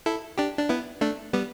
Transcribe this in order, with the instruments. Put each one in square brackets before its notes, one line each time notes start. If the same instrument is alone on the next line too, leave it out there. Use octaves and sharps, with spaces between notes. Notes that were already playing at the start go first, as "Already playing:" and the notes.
[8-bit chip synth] E4 A4
D4 G4
D4
B3 E4
A3 D4
G3 B3